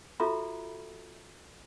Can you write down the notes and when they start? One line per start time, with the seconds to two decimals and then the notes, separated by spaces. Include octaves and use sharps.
0.20 F4 F#4 A4 E5 A#5 B5